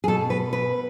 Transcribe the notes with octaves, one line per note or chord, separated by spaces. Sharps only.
G#4
B2 A4
B4
B4